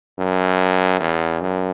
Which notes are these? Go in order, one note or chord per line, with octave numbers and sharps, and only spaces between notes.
F#2
E2
F#2